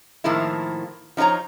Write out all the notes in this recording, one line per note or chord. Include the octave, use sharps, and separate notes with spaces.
A2 D#3 F3 A#3 E4
F3 D#4 F#4 C#5 A#5